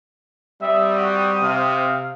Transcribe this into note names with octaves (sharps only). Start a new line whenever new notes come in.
G3 C4 E5 D#6
F#4
C3 F5